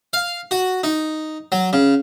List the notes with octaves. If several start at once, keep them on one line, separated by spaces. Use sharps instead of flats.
F5
F#4
D#4
F#3
C#3